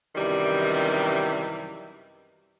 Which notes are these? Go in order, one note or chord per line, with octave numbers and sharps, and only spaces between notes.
F#2 C3 D#3 E3 G3